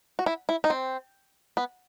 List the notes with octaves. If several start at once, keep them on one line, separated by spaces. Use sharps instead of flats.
F#4
E4
E4
D#4
C4
B3